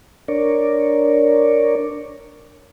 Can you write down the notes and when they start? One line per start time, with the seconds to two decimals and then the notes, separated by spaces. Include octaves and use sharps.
0.28 D4 A#4 C#5 D5